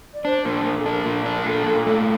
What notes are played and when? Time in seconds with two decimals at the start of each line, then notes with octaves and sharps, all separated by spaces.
0.14 D5
0.25 D4 C5
0.45 A#2 A#4
0.65 A#2 A#4
0.79 A4
0.85 D4
0.91 A#4
1.06 A#2
1.26 D4
1.37 A#4
1.46 A#2 A4
1.66 A#2 A4
1.87 A3 A4